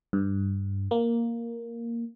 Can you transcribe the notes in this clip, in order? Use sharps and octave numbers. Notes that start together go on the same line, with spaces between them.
G2
A#3